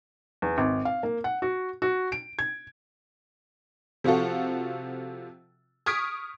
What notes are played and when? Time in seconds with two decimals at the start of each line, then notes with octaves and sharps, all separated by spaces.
0.42 E2
0.58 G#1
0.85 F5
1.03 A#3
1.24 F#5
1.42 F#4
1.82 F#4
2.12 D7
2.39 G#6
4.04 C3 F3 F4 F#4 A4
5.86 C#6 D#6 F6 G#6 B6 D7